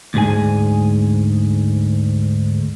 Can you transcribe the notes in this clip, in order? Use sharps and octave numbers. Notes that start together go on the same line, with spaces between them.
D2 G#2 G#4 G#5